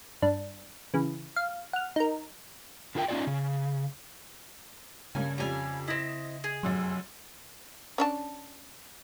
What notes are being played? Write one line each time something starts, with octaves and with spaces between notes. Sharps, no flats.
G2 D4
C#3 E3
F5
F#5 F6
D#4 A#4
D3 F4 A#4 G5
C#4 D#4 F4 G4 C#5 D5
C#3
G2 C#3 A#3 C#4 G#5
F2 G3 C#4 F4 G#5
C4 E4 D#5 A#6 E7
G#4
F1 F#2 F#3 C6
C#4 D4 A5